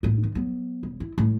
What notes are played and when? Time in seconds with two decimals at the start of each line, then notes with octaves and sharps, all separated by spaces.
0.03 A2 A#3
0.23 D#3
0.35 F#3 B3
0.83 E1
1.00 E4
1.18 A2 G#3